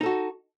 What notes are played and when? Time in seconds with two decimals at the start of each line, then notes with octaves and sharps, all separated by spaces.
0.01 D#4
0.03 A4
0.06 F#4